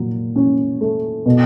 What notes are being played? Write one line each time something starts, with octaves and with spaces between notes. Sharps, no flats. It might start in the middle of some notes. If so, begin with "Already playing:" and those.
Already playing: A#2 F#3
C#4
A3
B2